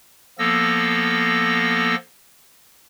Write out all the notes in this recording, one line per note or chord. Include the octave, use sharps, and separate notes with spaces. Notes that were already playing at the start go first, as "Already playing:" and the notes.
F3 A#3 B3 A4 E6 A#6